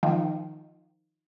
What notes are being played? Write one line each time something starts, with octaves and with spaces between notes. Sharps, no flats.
D#3 F3